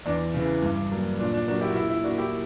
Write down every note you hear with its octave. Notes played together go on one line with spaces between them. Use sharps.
E2 D4
C#3 E3
G2
F#3 A#3
A#2 D4
D4
F#3 A#3 D4 F#4
E4 G4
F#4
A#2 E4
E4
A#3 D4 F#4
E4 G4